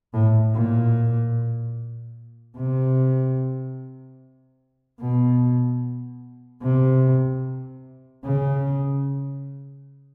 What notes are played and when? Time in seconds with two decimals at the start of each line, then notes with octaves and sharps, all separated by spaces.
0.14 A2
0.54 A#2
2.57 C3
5.00 B2
6.63 C3
8.25 C#3